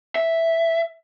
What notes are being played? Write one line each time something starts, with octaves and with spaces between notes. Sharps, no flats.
E5